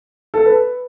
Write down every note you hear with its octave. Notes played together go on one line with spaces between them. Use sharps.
A4
B4